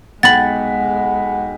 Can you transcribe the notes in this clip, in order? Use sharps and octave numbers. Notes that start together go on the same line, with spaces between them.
B1 G#3 F#5 G5 B5 A6 F#7